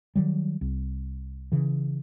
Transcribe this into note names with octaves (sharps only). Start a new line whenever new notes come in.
D#3 F#3 G3
C2
C#3 E3